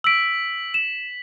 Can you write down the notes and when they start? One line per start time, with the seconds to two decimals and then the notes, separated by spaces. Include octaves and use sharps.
0.04 E6 B6 D7 F#7
0.74 E7